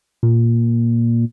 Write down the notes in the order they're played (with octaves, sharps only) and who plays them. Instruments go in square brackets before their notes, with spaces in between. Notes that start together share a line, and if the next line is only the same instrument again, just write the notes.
[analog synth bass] A#2